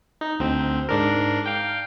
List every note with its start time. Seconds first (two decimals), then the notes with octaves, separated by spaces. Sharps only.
0.21 D#4
0.39 D2 C4
0.89 G#2 D4 A#4
1.46 F5 G5